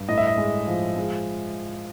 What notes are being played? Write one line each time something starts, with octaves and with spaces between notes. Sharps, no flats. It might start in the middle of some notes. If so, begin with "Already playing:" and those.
Already playing: G2
A2 D#5
E5
D#5
G#3
F3
G#3